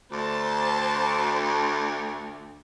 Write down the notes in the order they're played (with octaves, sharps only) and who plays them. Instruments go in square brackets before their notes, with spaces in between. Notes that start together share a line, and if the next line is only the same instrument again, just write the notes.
[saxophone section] D2 [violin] C5 A5